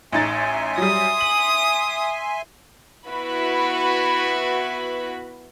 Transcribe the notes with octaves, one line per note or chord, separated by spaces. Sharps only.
A1 D#4 E5 G#5 C6 A6
F#3 G3 D#6
F#7
B3 E4 F#4 B4 B5